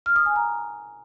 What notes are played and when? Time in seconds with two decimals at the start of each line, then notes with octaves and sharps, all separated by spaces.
0.06 F6
0.16 D#6
0.26 G#5
0.36 A#5